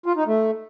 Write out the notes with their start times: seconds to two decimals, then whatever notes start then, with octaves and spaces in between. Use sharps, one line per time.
0.06 F4
0.16 D#4
0.27 A3